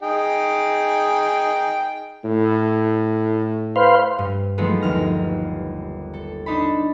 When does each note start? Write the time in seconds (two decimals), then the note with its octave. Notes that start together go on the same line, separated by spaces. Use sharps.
0.03 D#4 G#4 G5
2.24 A2
3.76 B4 C5 F5
4.18 G2
4.58 D#3 F3 F#3 G#3 A3 B3
4.81 G1 D#2 F6 A#6
6.14 A4
6.46 D4 D#4 A5 B5